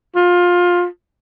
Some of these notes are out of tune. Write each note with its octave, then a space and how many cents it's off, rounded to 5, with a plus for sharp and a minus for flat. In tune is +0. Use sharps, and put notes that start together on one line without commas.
F4 +20